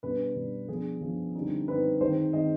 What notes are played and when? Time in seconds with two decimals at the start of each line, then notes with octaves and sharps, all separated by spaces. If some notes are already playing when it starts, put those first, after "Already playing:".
0.03 B2 G3 B3 D4 B4
0.36 B2 G3 B3 D4
0.69 F3 B3 D4 G#4
1.01 F3 B3 D4
1.35 D3 G3 C4 D#4
1.68 D3 G3 C4 D#4 B4
2.01 D#3 G#3 C4 D#4 C5
2.33 D#3 G#3 C4 D#4 D#5